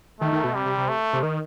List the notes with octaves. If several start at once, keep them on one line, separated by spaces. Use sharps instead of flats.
D#3 A3
D#3
B2
C3 G3
C3
C3
A3
C3
D#3